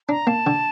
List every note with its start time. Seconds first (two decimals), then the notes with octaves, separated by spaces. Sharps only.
0.09 D4 A#5
0.27 A#3 A5
0.47 D3